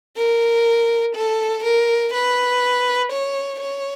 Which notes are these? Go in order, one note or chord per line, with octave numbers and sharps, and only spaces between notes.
A#4
A4
A#4
B4
C#5
C#5